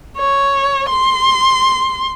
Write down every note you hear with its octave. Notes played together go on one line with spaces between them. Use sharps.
C#5
C6